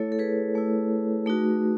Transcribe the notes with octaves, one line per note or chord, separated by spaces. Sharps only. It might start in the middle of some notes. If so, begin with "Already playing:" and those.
Already playing: A3 E4 A4 C#5
A4
G#4 B4
A3 E4
A3 D#4 F#4